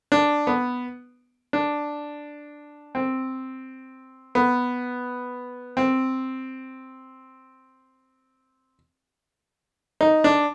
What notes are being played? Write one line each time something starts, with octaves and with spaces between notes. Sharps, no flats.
D4
B3
D4
C4
B3
C4
D#4
D4